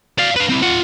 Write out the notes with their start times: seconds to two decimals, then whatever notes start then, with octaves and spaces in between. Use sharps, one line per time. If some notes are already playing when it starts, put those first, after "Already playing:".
0.18 D5 F5
0.36 B4 F5
0.49 C4 E4
0.62 F4 F#5